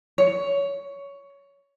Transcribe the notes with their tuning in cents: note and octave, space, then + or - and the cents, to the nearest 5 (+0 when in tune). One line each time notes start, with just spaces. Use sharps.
C#5 +15